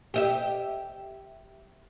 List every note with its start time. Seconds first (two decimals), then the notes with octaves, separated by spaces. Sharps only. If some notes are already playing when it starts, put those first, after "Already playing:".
0.14 G4 D#5 E5